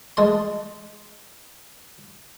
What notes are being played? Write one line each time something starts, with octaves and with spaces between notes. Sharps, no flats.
G#3 A5 C6